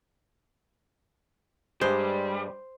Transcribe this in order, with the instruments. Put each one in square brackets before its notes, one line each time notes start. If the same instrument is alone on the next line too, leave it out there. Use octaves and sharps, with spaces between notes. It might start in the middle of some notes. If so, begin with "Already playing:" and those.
[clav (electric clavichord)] G2 G#3 [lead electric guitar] G3 [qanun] C5